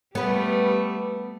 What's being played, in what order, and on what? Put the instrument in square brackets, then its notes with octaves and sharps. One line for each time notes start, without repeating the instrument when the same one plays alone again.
[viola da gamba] G3 A3 [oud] B3 B4